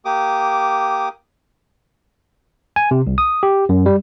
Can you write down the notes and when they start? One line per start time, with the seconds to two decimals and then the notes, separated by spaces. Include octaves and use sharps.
0.05 A#3 G4 D6 D#6
2.76 G#5
2.91 C3
3.07 C2
3.18 D#6
3.43 G4
3.69 F#2
3.86 G3